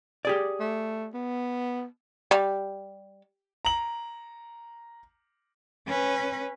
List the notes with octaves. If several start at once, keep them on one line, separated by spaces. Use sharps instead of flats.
G4 G#4 D5
A3
B3
G3
A#5 F#7
C#4 B4